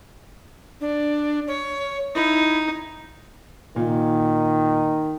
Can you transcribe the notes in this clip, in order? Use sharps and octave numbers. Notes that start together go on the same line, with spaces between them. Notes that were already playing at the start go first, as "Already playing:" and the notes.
D4
C#5
D#4 E4
A#2 D#3